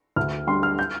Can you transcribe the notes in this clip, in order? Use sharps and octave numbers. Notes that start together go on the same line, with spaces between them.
D2 F6
D3 G3 C6
F6
G6